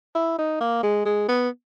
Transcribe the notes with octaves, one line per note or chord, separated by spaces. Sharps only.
E4
D#4
A#3
G#3
G#3
B3